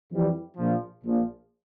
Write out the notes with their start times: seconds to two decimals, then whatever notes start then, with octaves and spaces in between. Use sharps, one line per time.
0.11 F2 E3 G3
0.57 A#1 A#2 F3
1.03 A#1 A#2 F3